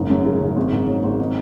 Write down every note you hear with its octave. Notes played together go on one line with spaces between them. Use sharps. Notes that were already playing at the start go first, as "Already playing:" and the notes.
Already playing: F#1 G#2
F#2
C#3
F#1
G#1
G#2
F#3
G#1
D#4